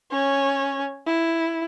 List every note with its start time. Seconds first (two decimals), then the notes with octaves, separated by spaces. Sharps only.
0.12 C#4 C#5
1.06 E4